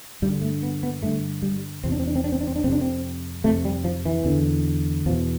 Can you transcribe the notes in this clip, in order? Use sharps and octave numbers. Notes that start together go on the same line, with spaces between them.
G2 D3 G3
A3
B3
B3
G2 D3 A3
G3
E2 C3 C4
D4
C4
D4
C4
D4
C4
D4
C4
D4
F2 C3 C4 D4
C4
F2 C3 A3
G3
F3
E3
E2 D3
E2 B2 F3